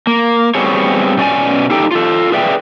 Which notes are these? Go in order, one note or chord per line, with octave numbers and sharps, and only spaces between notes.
A#3
G3 B3 C4 F#4 G#4 C#5
B2 C#4 D5 G#5
D#4 G4 A4 G5
F4 A4
G#4 B4 D5 E5 F#5 G5